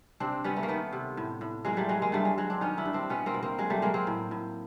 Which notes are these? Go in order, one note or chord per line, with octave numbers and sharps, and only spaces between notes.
C3 C4 D4
G3 B3 C#4
A3 B3
A#3
D#3 A3 B3
C3
A2
A2
F#3 G#3 A#3
G3 A3
F#3 G#3
G#3 A#3
G2 G3 A3
G#3
F#3 G#3
C4 D4
D#3 C#4 D#4
D4 E4
G2
C4 D4
B2 B3 C#4
A#3 C4
B2
A#3 C4
F#3 G#3
G3 A3
F#3 G#3 A#3
A#3 C4
A2
A2